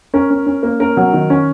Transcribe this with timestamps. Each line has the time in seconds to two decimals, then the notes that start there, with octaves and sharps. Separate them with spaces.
0.14 C#4 A#4
0.30 C#4
0.47 C#4
0.63 A#3
0.80 C#4 A#4
0.97 F#3
1.14 D#3
1.30 C#4